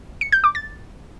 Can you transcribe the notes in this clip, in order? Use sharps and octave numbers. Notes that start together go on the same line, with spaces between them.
C#7
G6
D6
A6